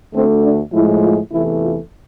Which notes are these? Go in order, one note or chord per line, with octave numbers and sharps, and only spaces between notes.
D2 D3 A3 C4
D4
A2 F3 G#3 E4
F4
E2 C3 E3 A3 E4
F4